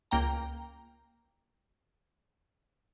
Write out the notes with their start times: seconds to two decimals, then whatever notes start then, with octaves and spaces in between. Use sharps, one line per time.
0.11 C#2 A#3 G5 A#5